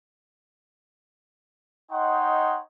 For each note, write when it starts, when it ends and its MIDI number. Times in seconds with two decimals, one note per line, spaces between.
1.92 2.59 63
1.92 2.59 73
1.92 2.59 75
1.92 2.59 78
1.92 2.59 79
1.92 2.59 84